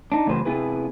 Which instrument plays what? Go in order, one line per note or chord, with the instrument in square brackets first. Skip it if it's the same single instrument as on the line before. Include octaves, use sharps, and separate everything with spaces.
[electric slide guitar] D4 D#4
E2 A2 C#3 F#3 B4 C5
C3 B3 E4 G#4 B4